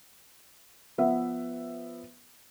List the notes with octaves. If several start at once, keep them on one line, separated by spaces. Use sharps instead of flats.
F3 B3 E5